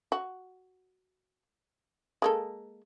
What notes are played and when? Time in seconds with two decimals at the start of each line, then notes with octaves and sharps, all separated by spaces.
0.12 F#4
2.22 G#3 A#3 A4